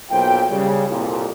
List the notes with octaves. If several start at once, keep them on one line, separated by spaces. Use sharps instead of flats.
B1 A#2 C5 G5
C#3 G3
C2 F2 A#2